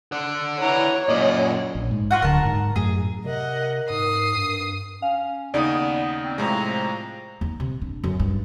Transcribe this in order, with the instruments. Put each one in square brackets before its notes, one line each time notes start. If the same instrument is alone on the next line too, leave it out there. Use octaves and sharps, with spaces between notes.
[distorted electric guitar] D5 F#5
[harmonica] E3 A#5 [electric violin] C#5
[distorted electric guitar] F#2 A#2 [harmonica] D5 D#5
[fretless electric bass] A#1
G#2
[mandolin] F4 F#4 F#5
[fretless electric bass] D1 D3 [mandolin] A#4 A5
[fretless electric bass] G#2
[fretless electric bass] F#2 A2 [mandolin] G#4
[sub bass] C3 [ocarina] A#4 [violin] D#5 F#5
[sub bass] G#2 [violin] D#6 C7
[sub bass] G2
[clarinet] C#4 [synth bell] F5
[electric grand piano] D#2 C#3 D#4 [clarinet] B3 [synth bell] D5 D#6
[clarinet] C4
[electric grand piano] A2 C3 G#3 [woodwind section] F3 A#5
[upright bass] D#2
C3
D4
F#2
G2